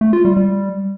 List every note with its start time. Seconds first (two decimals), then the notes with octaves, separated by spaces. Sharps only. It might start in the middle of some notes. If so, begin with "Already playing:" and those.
0.01 A3
0.13 F4
0.25 G3
0.37 G3